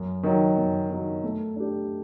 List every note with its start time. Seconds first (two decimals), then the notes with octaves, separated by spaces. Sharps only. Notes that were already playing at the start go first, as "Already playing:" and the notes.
Already playing: F#2
0.23 D#3 F#3
0.58 F#2
0.90 D#3 F#3
1.24 A3
1.56 D4 G4